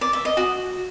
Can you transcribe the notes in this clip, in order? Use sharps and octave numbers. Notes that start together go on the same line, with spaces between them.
D5
E5
D#5
F#4